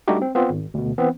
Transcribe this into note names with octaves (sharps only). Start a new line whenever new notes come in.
G3 A3 D4 D#4 F#4 G4
C4
B3 C4 F4
G#1
D2 B2
E3 B3 C4